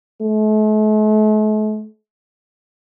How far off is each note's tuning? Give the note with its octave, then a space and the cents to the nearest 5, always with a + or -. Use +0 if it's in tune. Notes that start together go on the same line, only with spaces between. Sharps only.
A3 -45